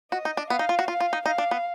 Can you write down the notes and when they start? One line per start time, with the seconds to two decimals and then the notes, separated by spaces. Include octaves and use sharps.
0.12 F#4 D#5
0.25 D#4
0.37 D4
0.50 B3 F5
0.59 D#4
0.69 F4
0.79 F#4
0.88 F4 F5
1.00 F4
1.13 D#4
1.26 D#4 F5
1.38 D4
1.51 B3